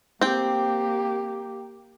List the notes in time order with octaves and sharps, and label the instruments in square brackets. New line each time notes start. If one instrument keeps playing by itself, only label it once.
[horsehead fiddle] A#3 G4 [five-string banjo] C4 G5